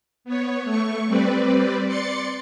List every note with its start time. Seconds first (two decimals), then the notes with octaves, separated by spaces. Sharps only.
0.24 B3 C#5
0.64 A3 C#6
1.07 G3 C4 B4 D5
1.86 D5 C6 A6 C#7